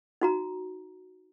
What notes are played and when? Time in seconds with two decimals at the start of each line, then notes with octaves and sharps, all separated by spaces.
0.21 D#4 F#4 A#5